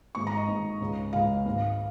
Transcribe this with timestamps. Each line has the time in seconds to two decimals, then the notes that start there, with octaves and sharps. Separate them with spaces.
0.15 G#1 G#2 G#3 C#6
0.27 A#5
0.37 D#5
0.48 G#1 G#2 G#3
0.80 C#2 C#3 G#3
1.13 C#2 C#3 G#3 F5
1.45 G#1 G#2 G#3